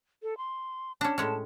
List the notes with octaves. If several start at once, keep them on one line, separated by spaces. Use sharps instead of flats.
A4
C6
C#4 D4 A5
A2 G#3 C#4